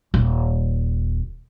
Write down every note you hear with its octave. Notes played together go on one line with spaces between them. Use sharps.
D#1